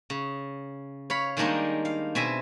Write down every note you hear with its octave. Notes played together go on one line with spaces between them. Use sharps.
C#3
C#5 F5 B5
D#3 G3 G#3 A#3 D4 D#4
F5
B2 C4 E5 G#5